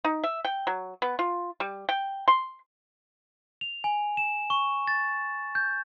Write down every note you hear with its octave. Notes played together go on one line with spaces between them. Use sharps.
D#4
E5
G5
F#3
B3
F4
G3
G5
C6
F7
G#5
E7
C#6
A6
G6